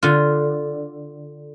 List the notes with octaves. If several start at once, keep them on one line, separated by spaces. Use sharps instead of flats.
D3 F4